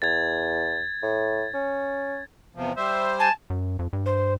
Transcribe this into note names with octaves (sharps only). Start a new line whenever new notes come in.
E2 G#6 A6
A2
C#4
E2 C3 F3
G3 C5 E5
G#5 A5
F#2
F2
G2
C5